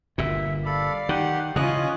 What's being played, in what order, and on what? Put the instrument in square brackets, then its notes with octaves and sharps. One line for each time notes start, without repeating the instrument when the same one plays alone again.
[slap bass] G1 A#2 [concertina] E5
[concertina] A4 B5 [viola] D5 F5
[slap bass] D#3 [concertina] G4 F#5
[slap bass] C#3 E3 [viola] C#4 F4 [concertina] D#5 D#6 F#6